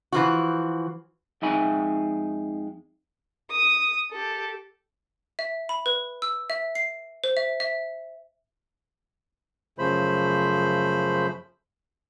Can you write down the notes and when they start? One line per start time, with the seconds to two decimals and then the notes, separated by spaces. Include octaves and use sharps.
0.12 E3 F3 F#4
1.42 F2 G#3 D#4 E5 G#5 B5
3.51 D#6
4.12 G4 A4
5.39 E5
5.69 B5
5.86 B4
6.22 E6
6.50 E5
6.75 C7
7.24 C5
7.37 E5
7.60 E5
9.78 F#2 C#3 F3 A3 C5 B5